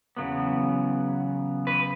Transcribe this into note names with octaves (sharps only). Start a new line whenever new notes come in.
E2 C#3 F#3 B3
B4